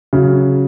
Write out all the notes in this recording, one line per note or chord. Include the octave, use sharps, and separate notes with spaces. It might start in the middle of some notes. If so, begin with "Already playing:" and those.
C#3 F#3